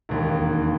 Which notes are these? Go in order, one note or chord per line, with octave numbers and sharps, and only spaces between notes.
E1 D#2 D#3